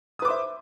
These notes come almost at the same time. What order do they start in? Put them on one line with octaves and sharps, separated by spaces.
D#6 B4 D6 C5 E5